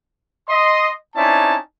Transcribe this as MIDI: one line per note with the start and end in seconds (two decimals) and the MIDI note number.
0.48 0.90 75
0.48 0.90 84
1.15 1.56 60
1.15 1.56 61
1.15 1.56 63
1.15 1.56 64
1.15 1.56 74
1.15 1.56 81